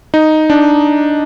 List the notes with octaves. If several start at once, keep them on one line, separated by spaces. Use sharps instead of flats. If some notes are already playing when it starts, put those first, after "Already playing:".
D#4
D4